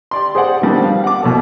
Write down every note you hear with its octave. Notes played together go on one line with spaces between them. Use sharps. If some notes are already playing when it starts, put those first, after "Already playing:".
G4 D5 C6
G#4 C5 D5 F#5
D#3 F3 G3 B3 C4 D4
F5
F#5 D6
C2 B2 F#3 A4